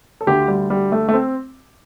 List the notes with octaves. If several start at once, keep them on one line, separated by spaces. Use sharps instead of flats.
A4
D2 D3 G4
G3
G3
A3
A3
C4